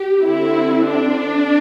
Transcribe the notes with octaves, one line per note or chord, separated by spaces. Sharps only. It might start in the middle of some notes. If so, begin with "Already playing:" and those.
Already playing: G4
D3 C4 E4
D4